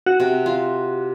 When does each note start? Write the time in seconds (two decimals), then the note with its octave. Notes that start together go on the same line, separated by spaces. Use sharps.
0.06 F#4
0.20 C3
0.46 F4